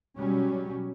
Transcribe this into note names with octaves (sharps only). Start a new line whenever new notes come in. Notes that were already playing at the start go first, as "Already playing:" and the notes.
B2 F#3 G3 C#4